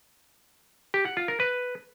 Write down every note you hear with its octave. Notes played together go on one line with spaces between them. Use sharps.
G4
F#5
F4
A#4
B4